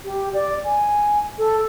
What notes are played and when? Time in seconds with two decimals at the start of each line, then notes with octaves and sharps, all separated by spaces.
0.05 G4
0.33 D5
0.65 G#5
1.39 A4